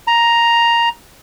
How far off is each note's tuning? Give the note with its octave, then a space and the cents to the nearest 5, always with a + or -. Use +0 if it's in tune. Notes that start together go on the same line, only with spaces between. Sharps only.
A#5 +5